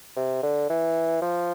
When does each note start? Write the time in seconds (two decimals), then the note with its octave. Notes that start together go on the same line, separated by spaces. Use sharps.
0.16 C3
0.43 D3
0.70 E3
1.22 F3